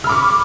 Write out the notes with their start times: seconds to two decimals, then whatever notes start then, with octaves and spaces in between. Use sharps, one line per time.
0.04 F6
0.07 B5
0.09 D6
0.12 C#6